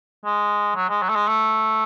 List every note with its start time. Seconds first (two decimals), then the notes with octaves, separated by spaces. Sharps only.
0.25 G#3
0.76 F#3
0.89 G#3
1.02 F#3
1.09 A3
1.15 G#3
1.27 A3